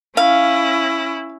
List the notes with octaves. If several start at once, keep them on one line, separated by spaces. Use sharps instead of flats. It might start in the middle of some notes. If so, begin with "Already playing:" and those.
C#4 E4 F5